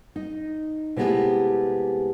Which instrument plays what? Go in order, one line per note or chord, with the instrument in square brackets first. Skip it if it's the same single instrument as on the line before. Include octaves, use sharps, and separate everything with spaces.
[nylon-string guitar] D#4
C3 G#3 A3 B3 E4 G4